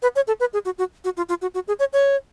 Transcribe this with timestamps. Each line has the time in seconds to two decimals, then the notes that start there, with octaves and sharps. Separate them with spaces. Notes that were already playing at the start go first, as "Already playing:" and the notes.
0.02 B4
0.16 C#5
0.27 A4
0.40 B4
0.53 G#4
0.65 F#4
0.78 F#4
1.05 F#4
1.17 F4
1.29 F4
1.42 F#4
1.54 F#4
1.68 G#4
1.79 C#5
1.93 C#5